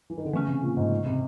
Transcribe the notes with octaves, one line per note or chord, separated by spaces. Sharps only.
E3
D#3
D3
C#3 E3 A3 C#4
C3
A#2
G#2
C3